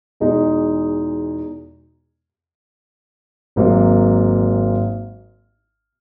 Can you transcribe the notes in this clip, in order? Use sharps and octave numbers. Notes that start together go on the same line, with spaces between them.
E2 B2 G#3 D#4
G#1 G#2 F#3 A#3